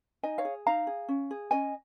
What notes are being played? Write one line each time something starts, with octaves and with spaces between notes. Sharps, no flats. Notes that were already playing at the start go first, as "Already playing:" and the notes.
D#4 D#5 G#5
C#5 F5
G#4
D#4 F5 A#5
G#4
C#4
G#4
C#4 D#5 G#5